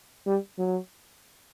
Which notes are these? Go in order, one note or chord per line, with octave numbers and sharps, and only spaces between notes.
G3
F#3